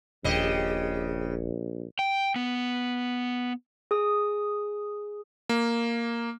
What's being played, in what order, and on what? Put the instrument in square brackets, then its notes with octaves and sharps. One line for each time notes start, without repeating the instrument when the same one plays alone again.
[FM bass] D#1 [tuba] A#1 [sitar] C#3 G4 D#5
[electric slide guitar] G5
B3
[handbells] G#4 D#6
[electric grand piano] A#3